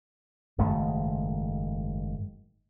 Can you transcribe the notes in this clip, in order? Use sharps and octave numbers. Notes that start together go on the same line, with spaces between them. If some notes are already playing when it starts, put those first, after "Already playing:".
F#1 G#2 D#3 A3